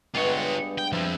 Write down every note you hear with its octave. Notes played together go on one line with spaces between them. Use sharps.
G2 G#3 B3 F4 C#5
B3
G5
F3 C4 E4 G#4